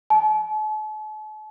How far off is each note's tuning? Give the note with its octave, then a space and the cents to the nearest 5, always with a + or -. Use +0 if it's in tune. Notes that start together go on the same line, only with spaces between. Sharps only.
A5 -45